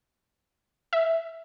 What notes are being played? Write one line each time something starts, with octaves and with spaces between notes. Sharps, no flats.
E5